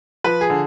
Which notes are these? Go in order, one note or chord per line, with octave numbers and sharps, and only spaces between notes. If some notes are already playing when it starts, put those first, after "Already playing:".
F3 B4
G#4
D3